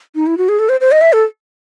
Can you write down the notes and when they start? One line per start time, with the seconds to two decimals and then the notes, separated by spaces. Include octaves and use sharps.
0.15 D#4
0.26 E4
0.38 F#4
0.49 G#4
0.59 A4
0.69 C5
0.81 C5
0.92 D#5
1.01 E5
1.13 A4